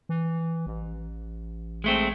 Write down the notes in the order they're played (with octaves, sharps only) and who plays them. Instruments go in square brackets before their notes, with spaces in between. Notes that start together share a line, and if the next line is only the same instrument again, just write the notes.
[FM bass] E3
A1
[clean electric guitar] G#3 A3 C4